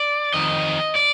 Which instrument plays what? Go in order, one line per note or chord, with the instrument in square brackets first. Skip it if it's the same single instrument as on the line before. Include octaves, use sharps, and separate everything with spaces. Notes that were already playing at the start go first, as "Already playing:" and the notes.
Already playing: [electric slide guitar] D5
F2 D#3 D#5
D5